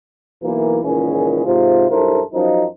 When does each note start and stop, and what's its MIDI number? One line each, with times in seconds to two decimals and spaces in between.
0.42 0.79 35
0.42 0.79 52
0.42 0.79 58
0.84 1.45 37
0.84 1.45 46
0.84 1.45 51
0.84 1.45 52
0.84 1.45 61
0.84 1.45 68
1.46 1.87 44
1.46 1.87 48
1.46 1.87 65
1.90 2.21 35
1.90 2.21 43
1.90 2.21 64
1.90 2.21 69
1.90 2.21 70
1.90 2.21 72
2.34 2.64 42
2.34 2.64 53
2.34 2.64 63